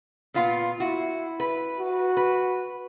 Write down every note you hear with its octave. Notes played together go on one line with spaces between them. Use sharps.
A#2 B3 F4
E4 F#4
B4
F#4
B4